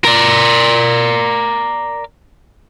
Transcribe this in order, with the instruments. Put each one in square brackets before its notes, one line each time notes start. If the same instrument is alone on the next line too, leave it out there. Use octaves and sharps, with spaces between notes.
[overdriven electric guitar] A#4 D5